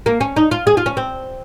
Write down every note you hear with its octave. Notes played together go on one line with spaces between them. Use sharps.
A#3
C#4
D#4
F4
G#4
F4
C#4
C4